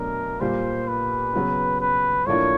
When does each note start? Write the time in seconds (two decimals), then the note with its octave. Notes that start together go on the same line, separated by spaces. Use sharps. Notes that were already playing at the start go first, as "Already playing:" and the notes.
Already playing: B2 F#3 A3 D4 A#4
0.41 A#2 G3 A#3 C5
0.88 B4
1.33 C#3 F#3 B3
1.81 B4
2.26 A2 F3 A#3 D4 F4 C#5